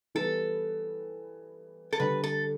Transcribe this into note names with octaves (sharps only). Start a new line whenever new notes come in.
E3 G3 B3 E4 A4
A4
D3 G3 D4 B4
A4